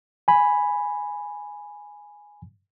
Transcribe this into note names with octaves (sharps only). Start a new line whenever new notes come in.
G#5 B5